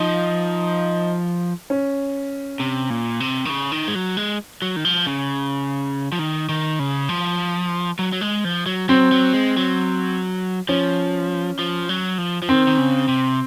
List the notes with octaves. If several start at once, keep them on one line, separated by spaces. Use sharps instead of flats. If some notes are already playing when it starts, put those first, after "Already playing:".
Already playing: F3 D#4
C#4
C3
A#2
C3
D#3
C#3
D#3
G#3
F#3
G#3
F#3
D#3
F3
C#3
F3
D#3
D#3
C#3
F3
F#3
F#3
G#3
F3
F#3
F#3 C4
F#3
G#3
F#3
F3 C#4
F3
F#3
F3
F3
D#3 C4
D#3
C#3
C3